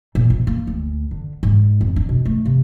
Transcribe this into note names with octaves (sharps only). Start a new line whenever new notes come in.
A#2
A#1
A#3
D2
D3
G#2
F2
D4
B2
A3
C3